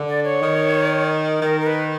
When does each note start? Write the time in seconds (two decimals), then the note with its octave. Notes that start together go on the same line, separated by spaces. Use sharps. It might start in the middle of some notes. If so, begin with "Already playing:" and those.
Already playing: D3
0.08 D5
0.24 C#5
0.42 D#3
1.40 D#3 A#4
1.61 A#4
1.67 B4